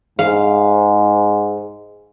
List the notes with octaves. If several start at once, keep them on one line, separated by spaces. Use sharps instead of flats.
G#2 G#4 F5